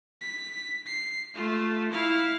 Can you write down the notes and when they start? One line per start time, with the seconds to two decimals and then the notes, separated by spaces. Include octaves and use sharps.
0.21 B6
0.87 C7
1.34 A3 F4
1.92 E4 F5